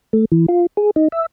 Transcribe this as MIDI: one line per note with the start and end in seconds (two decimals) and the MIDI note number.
0.13 0.25 57
0.32 0.46 52
0.48 0.66 65
0.77 0.91 68
0.96 1.08 63
1.12 1.26 76